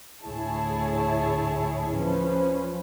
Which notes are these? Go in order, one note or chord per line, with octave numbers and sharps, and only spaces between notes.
D2 A2 E4 G#4 C#5 A5
F3 C#4 B4 C5